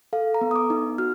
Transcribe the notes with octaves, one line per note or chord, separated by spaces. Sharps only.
A4 F5
A#5
B3
D#6
D6
D#4
F#4 F6